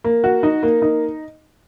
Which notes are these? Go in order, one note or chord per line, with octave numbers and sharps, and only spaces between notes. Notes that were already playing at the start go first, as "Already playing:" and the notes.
A#3
F#4
D#4
A#3
D#4